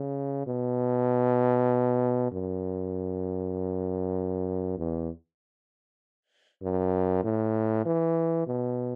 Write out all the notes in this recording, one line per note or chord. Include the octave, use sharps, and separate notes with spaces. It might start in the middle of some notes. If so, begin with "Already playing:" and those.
Already playing: C#3
B2
F#2
E2
F#2
A2
E3
B2